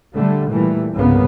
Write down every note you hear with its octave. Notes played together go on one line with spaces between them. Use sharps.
D3 G3 A3
A#2 E3 G3 A3
C2 G2 C#3 A#3 B3